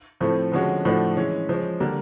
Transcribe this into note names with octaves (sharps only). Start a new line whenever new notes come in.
A2 F3 A3 C4
D3 F3 G#3 C#4 F#4
A2 F3 A3 D4 F#4
E3 G#3 C#4
F3 G#3 C#4
D3 G3 A#3